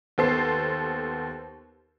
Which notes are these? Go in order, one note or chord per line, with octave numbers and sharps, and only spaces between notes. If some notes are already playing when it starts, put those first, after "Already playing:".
D#2 B3 A4 C5 C7